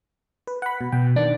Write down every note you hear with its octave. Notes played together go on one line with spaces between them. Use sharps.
B4
F#5 B5
B2
B2 G5
D#3 D4 D5